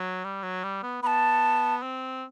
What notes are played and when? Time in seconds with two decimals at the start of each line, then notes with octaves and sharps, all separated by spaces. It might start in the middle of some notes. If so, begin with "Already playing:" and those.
Already playing: F#3
0.24 G3
0.43 F#3
0.64 G3
0.83 B3
1.02 B3 B5
1.07 A5
1.83 C4